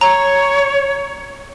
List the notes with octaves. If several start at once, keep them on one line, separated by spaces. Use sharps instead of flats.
C#5 A#5